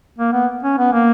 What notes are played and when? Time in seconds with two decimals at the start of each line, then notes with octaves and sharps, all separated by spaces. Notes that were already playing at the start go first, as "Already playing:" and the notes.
0.18 A#3
0.33 B3
0.63 C#4
0.78 B3
0.93 A#3